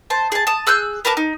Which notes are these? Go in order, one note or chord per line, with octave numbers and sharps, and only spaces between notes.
C5 A5
G#4 A5
A5 D#6
G#4 E6 F#6 G6
B3 A#4 A5 D6
D#4